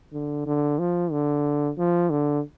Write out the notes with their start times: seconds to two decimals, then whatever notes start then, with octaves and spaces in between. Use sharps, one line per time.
0.13 D3
0.46 D3
0.79 F3
1.11 D3
1.78 F3
2.10 D3